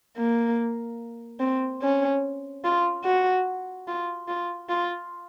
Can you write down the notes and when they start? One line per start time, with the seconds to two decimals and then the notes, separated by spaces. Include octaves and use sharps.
0.17 A#3
1.40 C4
1.82 C#4
2.64 F4
3.04 F#4
3.87 F4
4.28 F4
4.69 F4